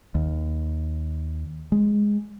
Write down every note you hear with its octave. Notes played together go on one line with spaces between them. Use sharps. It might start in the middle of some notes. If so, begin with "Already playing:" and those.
D#2
G#3